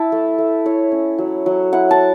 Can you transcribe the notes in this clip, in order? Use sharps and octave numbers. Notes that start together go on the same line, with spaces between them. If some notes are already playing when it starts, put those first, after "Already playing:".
Already playing: E4 E5 A5
A3
A3
E4 C#5
C#4
F#3
F#3
E4 F#5
A5